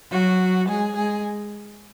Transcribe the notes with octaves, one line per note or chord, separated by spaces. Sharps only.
F#3 F#4
G#3 G#4
G#3 G#4